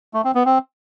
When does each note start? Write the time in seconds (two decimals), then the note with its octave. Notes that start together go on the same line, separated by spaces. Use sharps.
0.14 A3
0.24 C4
0.35 B3
0.45 C4